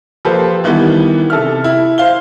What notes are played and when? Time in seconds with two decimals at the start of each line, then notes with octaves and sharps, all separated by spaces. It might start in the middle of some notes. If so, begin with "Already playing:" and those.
0.25 F3 A#3 G4 A4 B4 C5
0.64 D#3 E3 G3 B3
1.30 C3 A4 E5 F6
1.64 E4
1.98 C5 F5 G7